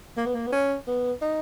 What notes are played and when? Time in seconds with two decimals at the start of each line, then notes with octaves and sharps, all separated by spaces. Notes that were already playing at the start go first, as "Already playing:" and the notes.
0.17 A#3
0.26 B3
0.35 A#3
0.47 B3
0.53 C#4
0.88 B3
1.22 D#4